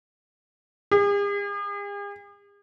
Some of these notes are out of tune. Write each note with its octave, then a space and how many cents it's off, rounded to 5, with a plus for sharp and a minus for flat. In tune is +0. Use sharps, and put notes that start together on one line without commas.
G#4 -45